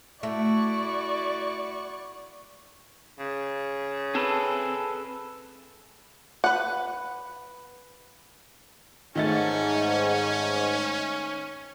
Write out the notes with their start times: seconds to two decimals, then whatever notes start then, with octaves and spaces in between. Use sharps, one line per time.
0.23 A3 E4 F#4 D5 C#6
3.19 C#3
4.15 C4 G#4 A4 B4
6.44 B4 F#5
9.16 G#2 D#3 A3 C#4 D#5 A6